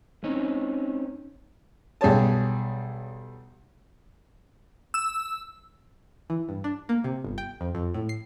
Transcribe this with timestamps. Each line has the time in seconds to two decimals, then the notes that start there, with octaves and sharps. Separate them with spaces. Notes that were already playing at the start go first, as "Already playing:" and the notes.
0.24 C4 C#4 D#4
2.01 B1 G3 G#4 C#5 A5
4.94 E6
6.30 E3
6.49 G2
6.64 D4
6.89 A#3
7.04 C3
7.25 G1
7.38 G5
7.61 F2
7.75 F2
7.94 A2
8.09 C7